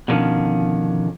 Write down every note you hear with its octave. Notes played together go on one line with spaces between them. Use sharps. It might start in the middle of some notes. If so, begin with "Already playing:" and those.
B2 D3 D#3 F3 C#4